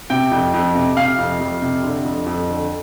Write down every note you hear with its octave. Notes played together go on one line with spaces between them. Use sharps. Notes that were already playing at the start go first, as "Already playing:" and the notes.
C3 G5
F2
F2
C3
C3 F5
F2
F2
C3
D3
F2
F2
D3